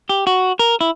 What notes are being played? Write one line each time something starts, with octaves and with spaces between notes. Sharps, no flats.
G4
F#4
A#4
E4